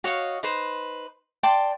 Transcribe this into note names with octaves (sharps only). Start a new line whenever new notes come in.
F#4 C#5 D#5 F5
D#4 B4 C5
D5 G5 A5 C6